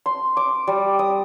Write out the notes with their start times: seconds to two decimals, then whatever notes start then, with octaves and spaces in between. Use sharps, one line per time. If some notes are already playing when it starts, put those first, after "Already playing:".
0.06 C6
0.37 D6
0.67 G3
0.99 D#6